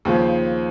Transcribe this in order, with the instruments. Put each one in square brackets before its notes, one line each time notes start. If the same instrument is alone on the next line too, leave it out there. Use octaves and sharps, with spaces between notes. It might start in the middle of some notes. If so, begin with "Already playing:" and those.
[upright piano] D#2 C#3 F3